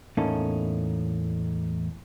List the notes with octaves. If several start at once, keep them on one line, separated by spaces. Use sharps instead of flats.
E2 A2 A#3 C#4 D#4 A4